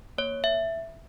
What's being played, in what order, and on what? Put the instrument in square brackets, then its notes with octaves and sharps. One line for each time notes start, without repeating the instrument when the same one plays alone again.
[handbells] A#3 C#5
E5